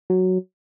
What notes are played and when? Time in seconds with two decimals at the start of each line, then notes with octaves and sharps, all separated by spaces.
0.10 F#3